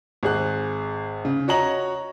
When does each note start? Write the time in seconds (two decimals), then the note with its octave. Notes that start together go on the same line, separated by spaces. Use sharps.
0.23 G#1 G#4 F#6
1.25 C#3
1.48 F#4 C#5 D#5 A#5 F#7